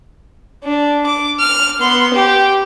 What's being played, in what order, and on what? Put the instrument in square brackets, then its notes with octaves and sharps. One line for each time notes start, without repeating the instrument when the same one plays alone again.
[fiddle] D4
D6
F6
B3 C6
G4